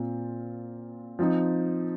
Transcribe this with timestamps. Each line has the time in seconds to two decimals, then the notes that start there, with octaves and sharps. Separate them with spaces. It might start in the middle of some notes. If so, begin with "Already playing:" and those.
Already playing: A#2 C4 F4
1.19 F3 C4 D#4